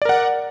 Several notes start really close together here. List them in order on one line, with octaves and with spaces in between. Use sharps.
D5 A#4 F#5